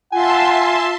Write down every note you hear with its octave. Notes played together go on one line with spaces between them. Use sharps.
F4 E5 F#5 G#5 A5 C6